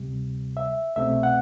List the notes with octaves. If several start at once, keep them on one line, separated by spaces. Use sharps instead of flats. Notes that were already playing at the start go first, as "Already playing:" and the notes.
Already playing: D2 C3 G3
E5
C2 B2 A3 C4 E5
F#5